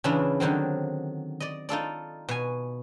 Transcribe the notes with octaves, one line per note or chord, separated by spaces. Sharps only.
C#3 E3 D4 E4 F4
D3 D#3 F#3 C4
D5 D#5
D#4 F4 A4 D5
B2 G#5